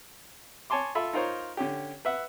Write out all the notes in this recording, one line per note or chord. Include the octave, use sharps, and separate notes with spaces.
C#5 G#5 A5 C6 D6
F4 A4 E5 B5
D#4 F4 A#4 C5 C#5
D3 C#4 G4
B4 E5 F#5